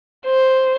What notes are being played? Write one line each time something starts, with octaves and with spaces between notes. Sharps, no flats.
C5